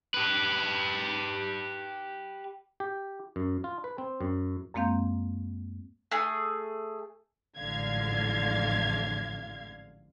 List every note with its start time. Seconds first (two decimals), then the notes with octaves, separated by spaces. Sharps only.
0.14 G4 B4
2.80 G4
3.36 F#2
3.64 F4
3.84 B4
3.98 C4
4.21 F#2
4.74 F#2 G#3 A#3 C4 F5 G6
6.11 A3 G#4
7.58 A1 F2 G#2 D3 F5 G#6